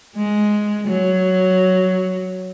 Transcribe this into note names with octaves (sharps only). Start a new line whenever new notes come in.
G#3
F#3